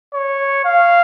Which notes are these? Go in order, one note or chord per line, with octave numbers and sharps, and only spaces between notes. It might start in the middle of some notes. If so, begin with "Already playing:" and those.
C#5
F5